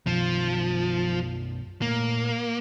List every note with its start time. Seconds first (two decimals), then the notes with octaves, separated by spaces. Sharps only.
0.07 F#2 B2 F3
1.82 A#2 A3 A#3